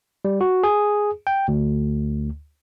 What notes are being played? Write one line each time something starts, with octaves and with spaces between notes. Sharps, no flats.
G3
F#4
G#4
G5
D2